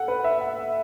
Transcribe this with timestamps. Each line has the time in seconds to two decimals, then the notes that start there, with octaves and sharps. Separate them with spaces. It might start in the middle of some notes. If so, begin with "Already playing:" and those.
Already playing: A4 F#5
0.08 B4
0.24 E5
0.41 F#5